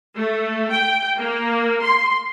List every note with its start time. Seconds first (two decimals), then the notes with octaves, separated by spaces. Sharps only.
0.16 A3
0.72 G5
1.19 A#3
1.83 C6